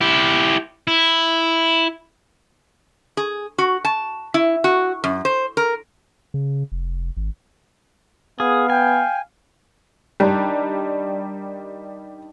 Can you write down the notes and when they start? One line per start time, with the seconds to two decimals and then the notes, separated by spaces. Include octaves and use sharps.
0.01 E4 G4
0.87 E4
3.17 G#4
3.58 F#4
3.85 A5
4.34 E4
4.64 F#4
5.04 F#2
5.25 C5
5.57 A#4
6.34 C#3
6.72 F1
7.17 G#1
8.40 B3 G#4 F5
8.70 G5 G#5
10.20 D#3 G3 D4